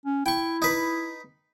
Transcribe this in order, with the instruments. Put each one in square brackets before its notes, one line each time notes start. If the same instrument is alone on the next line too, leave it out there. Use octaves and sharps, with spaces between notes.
[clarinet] C#4
[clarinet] E4 [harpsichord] G5 C#6
[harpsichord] D#4 B4